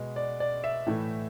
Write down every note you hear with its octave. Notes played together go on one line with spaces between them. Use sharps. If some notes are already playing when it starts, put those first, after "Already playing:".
Already playing: B2 G#3
D5
D5
E5
A2 E3 A3